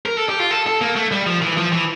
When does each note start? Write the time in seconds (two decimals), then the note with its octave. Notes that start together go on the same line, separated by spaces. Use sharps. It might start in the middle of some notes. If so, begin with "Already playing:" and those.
0.06 A#4
0.17 A4
0.29 G4
0.39 F4
0.51 A4
0.67 A4
0.81 A#3
0.96 A3
1.12 G3
1.26 F3
1.42 E3
1.57 F3
1.72 E3